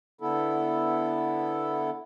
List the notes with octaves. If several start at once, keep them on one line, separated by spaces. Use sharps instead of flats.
D3 B3 E4 A4